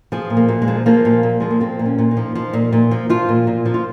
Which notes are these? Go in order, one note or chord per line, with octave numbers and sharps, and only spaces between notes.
F3 G#4
A#2
A#3
A#2
G#3
F3
F3 A#3
A#2
A#2
F3 G#3
A#3
F3 C4
A#2
C#4
A#2
D#4
F3
F3
A#2
A#2
F3
F3 F4
A#2
A#2
F3
F4